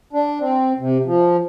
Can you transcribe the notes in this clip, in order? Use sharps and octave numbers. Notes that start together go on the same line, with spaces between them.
D4
C4
C3
F3